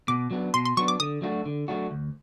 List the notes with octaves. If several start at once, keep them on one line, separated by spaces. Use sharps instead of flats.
B2 D6
F#3 B3 D4
B2 C6
C6
F#3 B3 D4 C#6
D6
D3 D#6
F#3 A3 D4 F#4
D3
F#3 A3 D4 F#4
D2